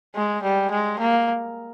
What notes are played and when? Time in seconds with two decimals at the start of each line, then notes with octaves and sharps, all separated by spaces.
0.15 G#3
0.43 G3
0.70 G#3
0.99 A#3